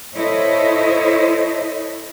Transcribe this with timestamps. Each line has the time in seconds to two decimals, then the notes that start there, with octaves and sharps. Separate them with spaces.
0.14 E4 A4 C5 C#5 D#5